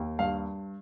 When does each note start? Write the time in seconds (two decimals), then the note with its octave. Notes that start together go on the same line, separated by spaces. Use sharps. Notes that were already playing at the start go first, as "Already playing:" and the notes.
Already playing: D#2
0.19 G2 F5